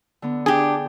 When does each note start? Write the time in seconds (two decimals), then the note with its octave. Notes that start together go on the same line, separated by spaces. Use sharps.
0.22 D3 B3
0.46 D4 G4 G#4 G5 A5